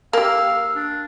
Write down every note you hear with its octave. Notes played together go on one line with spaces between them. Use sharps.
A#3 G4 F5 E6
D4